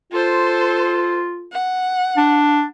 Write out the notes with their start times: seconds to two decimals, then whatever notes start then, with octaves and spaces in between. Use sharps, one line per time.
0.13 F4 A4 C5
1.52 F#5
2.17 D4